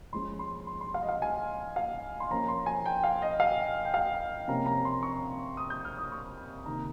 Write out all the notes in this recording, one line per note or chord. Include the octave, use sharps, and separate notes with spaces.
F3 G#3 C#4 C6
C6
C6
C6
F5
D#5
F5
G#5
F5
C6
F3 A#3 C#4 A#5
C6
G#5
G5
F5
D#5
F5
G5
F5
C3 F3 A#3 C#4 A#5
A#5
C6
C#6
D#6
G6
F6
D#6
C#6
C3 D#3 A#3 A#5